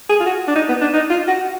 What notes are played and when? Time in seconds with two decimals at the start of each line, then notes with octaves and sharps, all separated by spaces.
0.10 G#4
0.20 F4
0.26 F#4
0.48 D4
0.56 D#4
0.69 B3
0.81 D4
0.94 D#4
1.10 F4
1.28 F#4